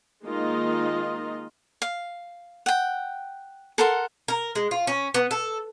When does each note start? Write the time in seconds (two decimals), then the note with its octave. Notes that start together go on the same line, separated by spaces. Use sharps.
0.24 D#3 G#3 A#3 D#4 F4 D#5
1.82 F5
2.66 F#5 G5
3.78 A4 A#4 F#5 C6
4.28 A#4
4.55 G#3
4.71 F4
4.87 C#4
5.14 B3
5.31 A4